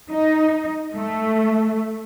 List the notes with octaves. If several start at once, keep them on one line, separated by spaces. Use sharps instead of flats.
D#4
A3